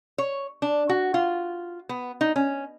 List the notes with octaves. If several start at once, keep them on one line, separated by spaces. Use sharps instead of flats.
C#5
D4
F#4
F4
B3
D#4
C#4